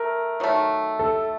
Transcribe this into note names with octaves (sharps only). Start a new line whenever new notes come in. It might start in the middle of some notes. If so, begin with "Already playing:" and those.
Already playing: A3 A#4
D#3 F#3 A3
A4